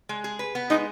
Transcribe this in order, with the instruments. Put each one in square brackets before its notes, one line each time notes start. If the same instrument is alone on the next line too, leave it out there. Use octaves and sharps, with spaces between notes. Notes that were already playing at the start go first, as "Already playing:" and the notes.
[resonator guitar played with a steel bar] G#3
G#4
B4
B3
[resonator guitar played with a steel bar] G#3 [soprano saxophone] D#4